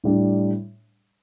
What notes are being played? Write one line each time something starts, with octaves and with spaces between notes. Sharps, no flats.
A2 G3 D4